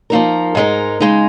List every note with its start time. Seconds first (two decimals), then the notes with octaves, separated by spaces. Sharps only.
0.10 F3 A#3 D#4 A#4
0.55 G#2 G#3 D#4 A#4
1.00 C#3 G#3 D#4